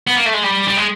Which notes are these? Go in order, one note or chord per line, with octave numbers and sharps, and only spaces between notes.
B3
A#3
A3
G#3
G3
G3
G#3